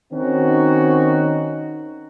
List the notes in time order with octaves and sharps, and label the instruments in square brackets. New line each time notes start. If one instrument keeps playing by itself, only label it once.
[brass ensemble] D#3 C4 C#4 D#4 F#4